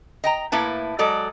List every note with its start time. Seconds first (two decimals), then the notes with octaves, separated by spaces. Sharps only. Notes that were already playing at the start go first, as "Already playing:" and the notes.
0.24 D#5 G5 A#5
0.52 A2 A#3 E4 B4 A5
0.99 F#3 G#3 A4 D5 D#5